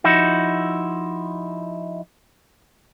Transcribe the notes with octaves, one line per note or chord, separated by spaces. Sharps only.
F3 D#4 E4 F#4